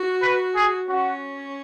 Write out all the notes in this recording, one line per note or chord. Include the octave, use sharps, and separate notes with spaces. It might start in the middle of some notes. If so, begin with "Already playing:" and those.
Already playing: F#4
B4
G#4
C#4 F#4